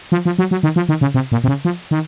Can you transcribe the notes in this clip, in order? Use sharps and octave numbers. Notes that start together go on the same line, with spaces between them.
F3
F3
F#3
F#3
D#3
F3
D#3
C#3
C3
A#2
C3
C#3
F3
D#3